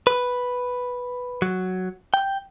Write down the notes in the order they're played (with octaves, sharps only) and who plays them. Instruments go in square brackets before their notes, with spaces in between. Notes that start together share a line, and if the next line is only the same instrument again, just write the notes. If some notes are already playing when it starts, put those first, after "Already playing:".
[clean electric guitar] B4
F#3
G5